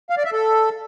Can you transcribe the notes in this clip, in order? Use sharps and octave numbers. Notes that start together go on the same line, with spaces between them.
F5
D5
E5
A4